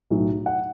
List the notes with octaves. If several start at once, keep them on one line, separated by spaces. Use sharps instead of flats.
B1 A2 F#3
F#5